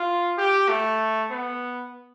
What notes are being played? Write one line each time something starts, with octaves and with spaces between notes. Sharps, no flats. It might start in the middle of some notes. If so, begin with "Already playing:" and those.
Already playing: F4
G4
A3
B3